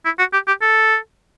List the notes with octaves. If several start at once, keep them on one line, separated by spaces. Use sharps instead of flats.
E4
F#4
G4
G4
A4